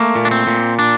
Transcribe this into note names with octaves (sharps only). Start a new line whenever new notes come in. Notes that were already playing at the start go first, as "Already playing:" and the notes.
Already playing: A3 A#3
A#2
D4
C4
A#2
D4